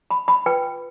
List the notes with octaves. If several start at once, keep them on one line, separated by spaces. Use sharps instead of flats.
B5
B5
F4 B4 G5